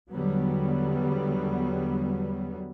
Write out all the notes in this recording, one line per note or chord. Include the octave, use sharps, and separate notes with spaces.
E2 D3 F#3 G3 B3